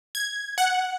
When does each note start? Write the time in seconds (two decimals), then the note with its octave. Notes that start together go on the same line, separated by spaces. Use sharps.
0.15 G#6
0.58 F#5